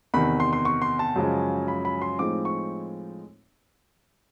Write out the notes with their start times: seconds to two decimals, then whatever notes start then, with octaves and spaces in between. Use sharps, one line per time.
0.14 E2 C3 D#3 B5
0.40 C6
0.53 C6
0.65 C#6
0.82 C6
0.99 A5
1.16 F#2 C#3 F3 G#3
1.68 B5
1.85 B5
2.02 C6
2.19 A2 F3 G#3 C4 D#4 D6
2.45 C#6